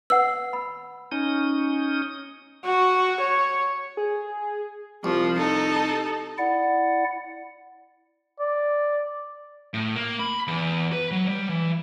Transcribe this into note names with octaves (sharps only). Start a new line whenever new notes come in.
B4 F#5 E6
B5
C#4 D#4 D#6
F#4
C#5
G#4
C2 F3
D#4 A4
E4 D5 F#5
D5
A2
A#3
B5
E2
B4
F#3
G3
E3